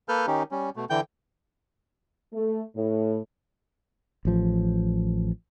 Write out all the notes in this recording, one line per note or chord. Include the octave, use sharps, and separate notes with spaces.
A#3 A4 B4 F6 G6
D#3 C#4 D#4 G4
G3 C#4
B2 A3
D3 E3 G5 G6
A3
A2
A1 F3